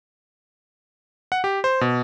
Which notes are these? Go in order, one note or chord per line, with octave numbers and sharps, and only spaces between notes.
F#5
G4
C5
B2